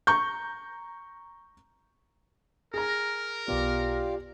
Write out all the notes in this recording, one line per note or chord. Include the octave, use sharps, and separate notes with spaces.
A#5 C#6 G6
G#4 A#4 A#5
B1 B2 B3 F4 G4 D5